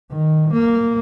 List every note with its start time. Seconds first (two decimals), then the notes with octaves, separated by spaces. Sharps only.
0.12 D#3
0.53 A#3